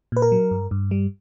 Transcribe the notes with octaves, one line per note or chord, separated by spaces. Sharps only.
A#2 B4
A#4
F#3
G2
G2
G3